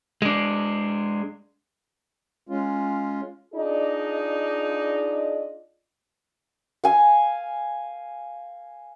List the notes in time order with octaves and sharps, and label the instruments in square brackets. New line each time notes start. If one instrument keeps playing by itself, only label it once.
[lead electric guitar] G#3 D4
[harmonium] G#3 C#4 F4
[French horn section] D4 D#4 F4 G#4 D5 D#5
[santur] F5 G#5